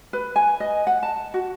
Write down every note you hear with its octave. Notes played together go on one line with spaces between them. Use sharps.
B4
G#5
D#5
F#5
A5
F#4